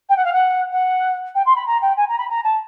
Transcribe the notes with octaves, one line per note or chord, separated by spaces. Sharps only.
G5
F#5
F5
F#5
F#5
G5
C6
B5
A#5
G5
G#5
A#5
B5
A#5
A5